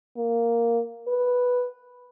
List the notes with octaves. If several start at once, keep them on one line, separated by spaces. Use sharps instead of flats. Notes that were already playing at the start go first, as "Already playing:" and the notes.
A#3
B4